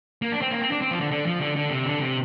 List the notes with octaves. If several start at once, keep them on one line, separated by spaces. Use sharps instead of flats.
A#3
D4
C4
A#3
C4
D4
C4
F3
D3
D3
F3
D3
D3
C3
D3
C3